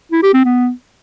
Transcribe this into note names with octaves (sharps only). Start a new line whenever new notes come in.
E4
G4
C4
B3